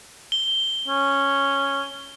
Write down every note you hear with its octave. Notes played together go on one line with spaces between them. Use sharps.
G7
C#4